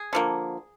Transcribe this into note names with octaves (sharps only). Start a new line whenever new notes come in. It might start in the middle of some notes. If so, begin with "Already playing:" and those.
Already playing: G#4
D3 F3 A#3